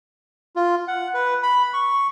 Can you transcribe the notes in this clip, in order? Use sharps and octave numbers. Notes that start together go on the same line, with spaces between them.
F4
F#5
B4
B5
C#6